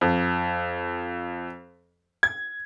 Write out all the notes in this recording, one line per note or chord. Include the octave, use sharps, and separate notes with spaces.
F2
G#6